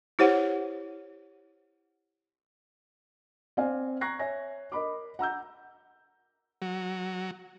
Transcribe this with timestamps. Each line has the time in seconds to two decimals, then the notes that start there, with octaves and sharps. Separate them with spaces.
0.19 E4 G4 C5 C#5 F#5
3.57 C4 D5 F5 G#5
4.01 A#5 C#6 F#6 G#6 A#6 C7
4.19 C#5 E5 G#5 A#6
4.72 A#4 D#5 B5 D6
5.19 F#5 A#5 E6 G6
6.62 F#3